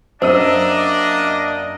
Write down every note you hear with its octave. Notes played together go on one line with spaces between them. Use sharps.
F#2 A#3 D4 C5 D#5 E6 D#7